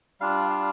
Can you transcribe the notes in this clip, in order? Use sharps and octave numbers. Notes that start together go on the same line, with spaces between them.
G3 D4 F4 F5
F5